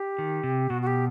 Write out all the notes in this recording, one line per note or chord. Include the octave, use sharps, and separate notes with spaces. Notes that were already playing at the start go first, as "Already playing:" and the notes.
Already playing: G4
D#3
C3
B2 F#4
F#4
G4